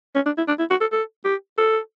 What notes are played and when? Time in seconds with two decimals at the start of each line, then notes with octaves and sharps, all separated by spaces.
0.15 C#4
0.26 D4
0.38 E4
0.48 D4
0.59 E4
0.70 F#4
0.81 A4
0.92 A4
1.25 G4
1.58 A4